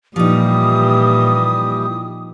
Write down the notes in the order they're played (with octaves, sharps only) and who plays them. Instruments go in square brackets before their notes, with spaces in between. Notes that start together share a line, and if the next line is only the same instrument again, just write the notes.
[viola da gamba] A#2 [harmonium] E3 G3 G4 [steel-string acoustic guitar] F3 D#4 [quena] D#6